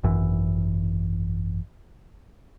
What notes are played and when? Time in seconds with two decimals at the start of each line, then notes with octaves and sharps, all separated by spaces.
0.03 G#1 F#2 E3